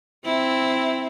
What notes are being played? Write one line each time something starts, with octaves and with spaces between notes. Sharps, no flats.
C4 E4